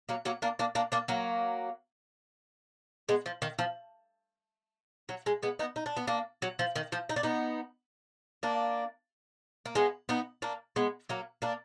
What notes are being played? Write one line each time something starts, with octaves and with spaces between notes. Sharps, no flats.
F#3 A#3
F#3 A#3
A#3 D4
A#3 D4
A#3 D4
A#3 D4
F#3 A#3
G#3 B3
F3
D#3
F3
F#3
G#3
G#3 B3
B3 D#4
D#4
D4
B3
A#3 D4
F#3
F3
D#3
F3
D#4
D4
B3 D#4
A#3 D4
A#3
G#3 B3
B3 D#4
A#3 D4
G#3 B3
F#3 A#3
A#3 D4